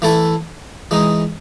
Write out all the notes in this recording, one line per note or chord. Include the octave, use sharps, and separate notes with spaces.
E3 A3 E4 A4
E3 G#3 D#4